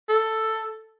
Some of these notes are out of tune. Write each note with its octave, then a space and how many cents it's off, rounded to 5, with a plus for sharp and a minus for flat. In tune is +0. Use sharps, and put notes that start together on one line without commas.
A4 +5